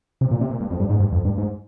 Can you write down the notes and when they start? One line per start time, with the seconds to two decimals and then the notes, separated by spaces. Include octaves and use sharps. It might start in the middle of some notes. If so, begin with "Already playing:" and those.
0.21 C3
0.31 A#2
0.41 C3
0.51 A#2
0.61 G2
0.71 F2
0.80 G2
0.90 G#2
1.00 G2
1.12 F2
1.25 G2
1.38 G#2